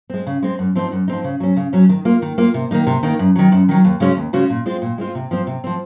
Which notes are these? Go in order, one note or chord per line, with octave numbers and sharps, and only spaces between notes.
G#3 C4
C#3
G#3 C4
F#2
F3 C4 D#4
F#2
F3 C4 D#4
C#3
F#3 C#4
C#3
F#3 C#4
D#3
A#3 F4
D#3
A#3 F4
C3
D#3 A#3 D#4
C3
D#3 A#3 D#4
F#2
D#3 F#3
F#2
D#3 F#3
D#2
C#3 G#3 C#4 F#4
D#2
C#3 G#3 C#4 F#4
A#2
G#3 C4 F4
A#2
G#3 C4 F4
C3
F3 C4
C3
F3 C4